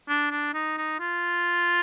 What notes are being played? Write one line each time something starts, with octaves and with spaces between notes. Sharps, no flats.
D4
D4
D#4
D#4
F4